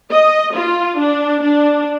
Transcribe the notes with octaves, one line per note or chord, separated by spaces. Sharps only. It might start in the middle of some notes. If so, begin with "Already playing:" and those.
D#5
F4
D4
D4